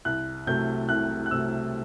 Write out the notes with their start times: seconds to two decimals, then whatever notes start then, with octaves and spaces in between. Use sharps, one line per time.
0.05 C2 F#6
0.47 C3 F#3 A3 G6
0.89 C2 F#6
1.26 F#6
1.31 C3 F#3 A3 E6